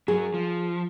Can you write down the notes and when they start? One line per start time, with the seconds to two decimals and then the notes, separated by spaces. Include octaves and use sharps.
0.08 F#2 F#3 G#4
0.34 F3